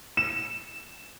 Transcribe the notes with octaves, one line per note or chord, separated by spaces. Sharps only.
E7